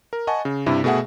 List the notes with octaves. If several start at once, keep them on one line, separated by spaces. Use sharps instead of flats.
A#4
D#5 F#5 G#5 A5 C#6
C#3
G2 C3 E4
B2 A3 G#4 E5 F#5